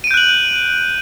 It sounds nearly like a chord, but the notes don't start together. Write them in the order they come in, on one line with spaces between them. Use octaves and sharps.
D#7 D7 G6 F#6 F#7